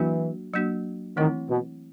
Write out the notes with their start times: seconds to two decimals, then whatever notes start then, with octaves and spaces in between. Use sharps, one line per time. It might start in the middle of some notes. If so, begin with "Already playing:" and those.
Already playing: E3 F#3 A#3 D4 F#4
0.54 F#3 A#3 D4 F#4
1.17 D#3 E3 A3 C4 E4
1.49 B2